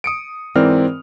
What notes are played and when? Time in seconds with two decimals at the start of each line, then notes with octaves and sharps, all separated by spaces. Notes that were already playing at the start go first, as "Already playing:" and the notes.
0.04 D#6 C#7 D7
0.56 G#2 E3 C4 A#4 D5 F6